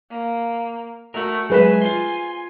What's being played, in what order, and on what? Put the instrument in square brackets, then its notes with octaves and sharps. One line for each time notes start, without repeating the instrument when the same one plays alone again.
[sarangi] A#3
[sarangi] A3 [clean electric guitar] F#4 A#4
[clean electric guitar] F#3 G#3 E5 [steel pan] G#4 B4 [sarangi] G#5
[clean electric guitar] F4 C5